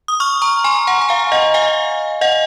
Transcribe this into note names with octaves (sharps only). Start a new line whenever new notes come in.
D#6
C#6 F6
A#5 C#6
G#5 C6
F#5 A#5
A#5
F5 G#5
D#5 F#5
F5 G#5
D#5 F#5